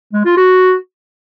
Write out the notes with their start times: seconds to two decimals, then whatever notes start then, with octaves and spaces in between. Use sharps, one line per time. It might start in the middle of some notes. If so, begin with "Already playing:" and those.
0.13 G#3
0.25 F4
0.37 F#4